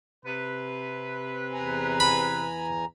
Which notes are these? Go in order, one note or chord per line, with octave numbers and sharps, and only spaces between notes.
C3 B4
E2 G#5 A#5
B5